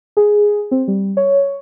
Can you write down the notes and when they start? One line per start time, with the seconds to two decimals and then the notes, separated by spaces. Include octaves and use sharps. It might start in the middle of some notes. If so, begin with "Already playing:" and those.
0.17 G#4
0.71 C4
0.88 G3
1.17 C#5